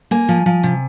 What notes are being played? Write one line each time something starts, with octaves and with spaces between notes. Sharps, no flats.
A#3 G#5
F3
F3
C3